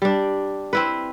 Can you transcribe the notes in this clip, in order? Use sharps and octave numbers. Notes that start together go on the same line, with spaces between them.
G3 D4
C4 E4 B4